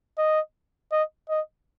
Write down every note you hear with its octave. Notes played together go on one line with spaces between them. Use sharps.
D#5
D#5
D#5